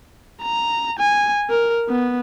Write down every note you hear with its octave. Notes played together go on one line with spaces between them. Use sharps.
A#5
G#5
A#4
B3